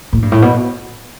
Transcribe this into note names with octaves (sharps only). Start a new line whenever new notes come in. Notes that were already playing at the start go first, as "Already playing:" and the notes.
A2
G2
A2
B2